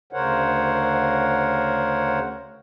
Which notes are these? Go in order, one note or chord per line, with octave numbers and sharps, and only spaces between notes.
D2 C#3 A#4 C5 C#5 F#5